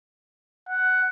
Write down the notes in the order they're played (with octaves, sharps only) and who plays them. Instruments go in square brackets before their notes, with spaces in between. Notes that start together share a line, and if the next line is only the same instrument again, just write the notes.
[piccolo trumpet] F#5